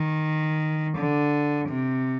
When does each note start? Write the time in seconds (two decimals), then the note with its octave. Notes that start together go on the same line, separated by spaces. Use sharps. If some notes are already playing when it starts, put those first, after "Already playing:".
Already playing: D#3
0.97 D3
1.69 C3